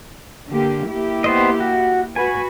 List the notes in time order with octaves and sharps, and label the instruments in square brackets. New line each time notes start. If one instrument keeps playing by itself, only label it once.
[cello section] D3 A#3 G4
A#3 E4 G4
[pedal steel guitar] B3 C5 D#5
F#4
[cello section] F#4 B4 [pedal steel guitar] G#5